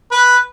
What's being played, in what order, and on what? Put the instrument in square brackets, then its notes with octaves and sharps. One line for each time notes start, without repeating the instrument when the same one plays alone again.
[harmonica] B4